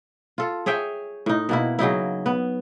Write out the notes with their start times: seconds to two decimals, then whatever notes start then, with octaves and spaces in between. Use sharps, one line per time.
0.38 F4 A4
0.66 G#4 C#5 E5 G5
1.26 A2 D#4
1.49 B2 A#3 E4
1.79 C#3 F#3 D#4 E4
2.26 B3